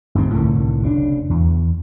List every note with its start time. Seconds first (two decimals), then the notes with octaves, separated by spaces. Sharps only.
0.15 G1 D#2 G#2 C4
0.34 C2 A2 D3 D#3
0.83 F1 C#3 C#4 D4
1.30 E2